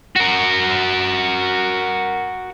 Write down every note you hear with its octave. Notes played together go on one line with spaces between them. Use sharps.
F#4 A#4